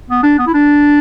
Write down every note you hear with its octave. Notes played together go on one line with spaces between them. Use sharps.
B3
D4
B3
E4
D4